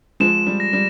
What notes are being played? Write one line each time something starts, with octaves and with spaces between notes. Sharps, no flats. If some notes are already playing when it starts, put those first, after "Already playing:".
F3 G#3 E7
G3
A#6
G3